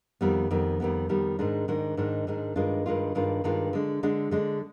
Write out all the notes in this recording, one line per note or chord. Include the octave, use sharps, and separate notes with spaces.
F2 D#3 G3 B3
F2 D#3 G3 B3
F2 D#3 G3 B3
F2 D#3 G3 B3
G#2 D#3 G#3 D4
G#2 D#3 G#3 D4
G#2 D#3 G#3 D4
G#2 D#3 G#3 D4
G2 D#3 G#3 D4 F4
G2 D#3 G#3 D4 F4
G2 D#3 G#3 D4 F4
G2 D#3 G#3 D4 F4
D3 G#3 D4
D3 G#3 D4
D3 G#3 D4